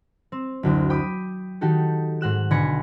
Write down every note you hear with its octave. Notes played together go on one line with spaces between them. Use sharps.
C4
F#1 D2 D3
G5 B5 D6 D#6
D#3 D#4 F#4 G4 A4
G#2 F#4 F#6 E7
B1 D3 G#5 B5 A#6 C#7